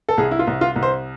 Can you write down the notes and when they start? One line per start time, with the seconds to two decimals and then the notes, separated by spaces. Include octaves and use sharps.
0.09 A4
0.18 C2 G#4
0.31 E4
0.39 F4
0.47 C2
0.61 F4
0.76 C2
0.83 C5